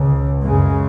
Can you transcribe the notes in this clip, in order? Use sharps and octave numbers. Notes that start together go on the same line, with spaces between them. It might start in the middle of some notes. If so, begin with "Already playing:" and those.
Already playing: C#2 C#3
F#2 C#3 G#3